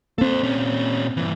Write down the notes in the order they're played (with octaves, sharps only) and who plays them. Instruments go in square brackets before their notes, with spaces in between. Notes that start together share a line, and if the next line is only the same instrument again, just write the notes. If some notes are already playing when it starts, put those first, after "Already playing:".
[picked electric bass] A#3 C4 [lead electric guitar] A4 C5
[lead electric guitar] A#2 C#4
G2 E3